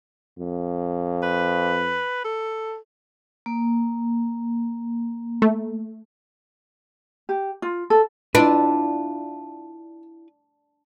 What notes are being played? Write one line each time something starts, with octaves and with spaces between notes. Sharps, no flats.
F2
B4
A4
A#3
A3
G4
F4
A4
D4 E4 F4 B4